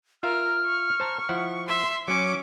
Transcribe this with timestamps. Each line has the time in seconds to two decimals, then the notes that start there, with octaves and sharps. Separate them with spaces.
0.23 F4 A#4 E5 F5 F6
0.65 C#6
1.00 C5 A5 A#5
1.29 F3 E4 F#5
1.68 E5 C6
2.08 F#3 C#4 D6 C#7